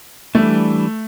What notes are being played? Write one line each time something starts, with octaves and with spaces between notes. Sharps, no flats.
E3 G3 A3 D4